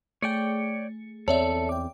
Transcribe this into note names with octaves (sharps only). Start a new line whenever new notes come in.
A3 G#4 C#5 D5 G5 C#7
E2 C4 A4 C#5 D5 E5
G5 D6